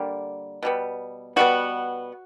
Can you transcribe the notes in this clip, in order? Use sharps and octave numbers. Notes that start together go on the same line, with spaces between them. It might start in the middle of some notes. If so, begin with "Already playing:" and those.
Already playing: D3 G3 A#3
B2 G3 B3
B2 G3 B3 F#4